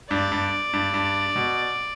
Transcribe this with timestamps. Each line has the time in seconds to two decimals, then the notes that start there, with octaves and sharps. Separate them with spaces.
0.10 G2 D5
0.32 G2
0.73 G2
0.94 G2
1.36 B2